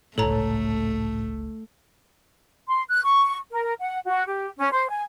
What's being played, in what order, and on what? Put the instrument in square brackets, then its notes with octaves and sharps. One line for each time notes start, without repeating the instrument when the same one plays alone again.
[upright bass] G1 C#2 [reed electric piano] A2 A5 [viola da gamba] A3 [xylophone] A4 C#5 A#5
[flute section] C6
F#6
C#6
A#4
F#5
F#4
G4
C#4
C5
G#5